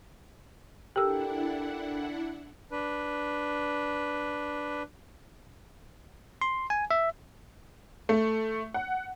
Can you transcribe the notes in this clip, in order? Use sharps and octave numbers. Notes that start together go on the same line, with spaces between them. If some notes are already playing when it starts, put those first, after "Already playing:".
D4 E4 G4 A4 A#4 F#5 G5 E6
D4 B4
C6
G#5
E5
A3
F#5